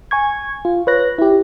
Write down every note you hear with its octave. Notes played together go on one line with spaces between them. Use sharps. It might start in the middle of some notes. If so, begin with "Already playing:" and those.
G#5 C#6 G#6
F4
B4 C#5 F#6 A#6
E4 G4